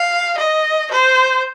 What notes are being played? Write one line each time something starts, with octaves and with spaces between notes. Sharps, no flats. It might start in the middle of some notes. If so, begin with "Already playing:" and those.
Already playing: F5
D#5
C5